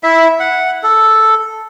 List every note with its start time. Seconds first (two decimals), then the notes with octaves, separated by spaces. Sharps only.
0.03 E4 E5
0.40 F#5
0.83 A4